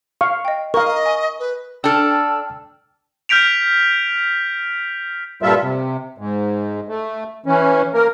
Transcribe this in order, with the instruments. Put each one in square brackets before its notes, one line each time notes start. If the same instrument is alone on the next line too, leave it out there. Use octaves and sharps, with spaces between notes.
[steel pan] F5 C#6
[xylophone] D#5 G5
[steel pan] A#4 F5 [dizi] D#5 [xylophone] C#6
[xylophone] G#5 C#6
[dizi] B4
[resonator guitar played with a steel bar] D4 A4 [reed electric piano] G5 A5 F6 [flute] E6
[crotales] F6 G6 B6 D7 F7
[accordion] G2 A#2 G3 F4 A4 E5
C3
G#2
A3
E3 C#4
A#3 A#4